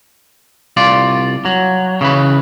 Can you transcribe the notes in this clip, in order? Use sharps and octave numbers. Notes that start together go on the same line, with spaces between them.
C2 F4 D5
F#3
C#3 E3 B4